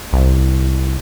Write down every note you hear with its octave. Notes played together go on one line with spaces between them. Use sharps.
C2